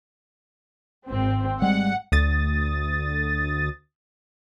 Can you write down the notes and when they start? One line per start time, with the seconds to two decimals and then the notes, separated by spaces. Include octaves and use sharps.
1.08 G#1 C4
1.62 G3 G#3 F#5
2.12 D2 D#6 A6